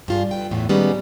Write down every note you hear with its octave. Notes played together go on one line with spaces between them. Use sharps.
G2 F4 G#4
A3 B4 G5
E2 A2 E3 B3
D#3 G3 G#3 A#3 B3 C#4